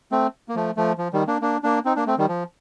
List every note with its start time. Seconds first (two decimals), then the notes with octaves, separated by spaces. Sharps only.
0.12 A3 C4
0.49 A#3
0.55 F3 A3
0.77 F3 A3
0.98 F3
1.13 D#3 G3
1.27 A#3 D4
1.42 A#3 D4
1.63 A#3 D4
1.85 C4 D#4
1.96 A#3 D4
2.07 A3 C4
2.18 D#3 G3
2.28 F3